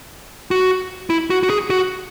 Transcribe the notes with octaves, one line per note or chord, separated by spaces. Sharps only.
F#4
E4
F#4
F#4
G#4
F#4